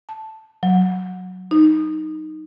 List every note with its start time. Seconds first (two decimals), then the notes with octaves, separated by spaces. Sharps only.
0.09 A5
0.63 F#3
1.51 D#4